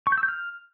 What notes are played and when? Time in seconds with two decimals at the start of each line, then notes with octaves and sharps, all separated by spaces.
0.07 C#6
0.12 G6
0.18 E6
0.23 G6
0.28 F6